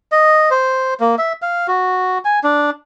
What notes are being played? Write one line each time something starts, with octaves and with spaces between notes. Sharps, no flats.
D#5
C5
A#3
E5
F5
F#4
G#5
D4